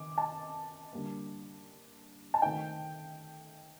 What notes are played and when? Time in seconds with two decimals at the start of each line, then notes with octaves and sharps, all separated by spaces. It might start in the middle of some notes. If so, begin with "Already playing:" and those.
Already playing: D#3 D6
0.18 A5
0.93 D3 G3 A#3
2.34 A5
2.42 D#3 A3 C4 D#4 G5